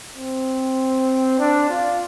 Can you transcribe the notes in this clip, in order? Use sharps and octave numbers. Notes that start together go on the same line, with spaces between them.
C4
D4
F4